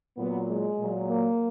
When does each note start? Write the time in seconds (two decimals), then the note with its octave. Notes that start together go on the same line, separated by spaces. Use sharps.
0.18 A#2 F#3 B3
0.49 G#3
0.79 A#2 F#3
1.09 A#3